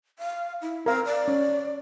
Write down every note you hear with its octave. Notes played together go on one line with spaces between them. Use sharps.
F5
E4
C4 A#4 F5
D5
C#4